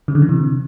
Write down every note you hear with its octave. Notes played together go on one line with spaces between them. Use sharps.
C#3
D3
E3
C3